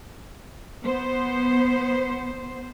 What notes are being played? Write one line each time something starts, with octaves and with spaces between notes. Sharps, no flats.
B3 C5